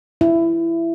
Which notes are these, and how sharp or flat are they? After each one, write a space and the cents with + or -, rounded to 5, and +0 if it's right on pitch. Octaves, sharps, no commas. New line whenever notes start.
E4 +15